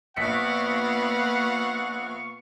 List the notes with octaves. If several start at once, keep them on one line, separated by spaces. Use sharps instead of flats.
A#1 A#3 B3 F5 F#5 C#6 B6 C#7